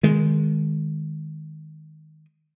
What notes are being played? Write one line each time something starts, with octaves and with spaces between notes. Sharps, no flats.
D#3 G#3